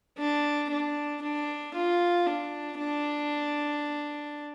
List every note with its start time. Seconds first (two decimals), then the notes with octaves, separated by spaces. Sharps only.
0.18 D4
0.70 D4
1.22 D4
1.74 F4
2.27 D4
2.79 D4